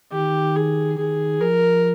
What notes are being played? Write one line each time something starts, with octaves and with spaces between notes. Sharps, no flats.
D#3 G4
G#4
D#3 G#4
F3 A#4